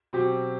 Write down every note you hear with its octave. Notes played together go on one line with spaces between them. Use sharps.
B2 F#3 C4 G4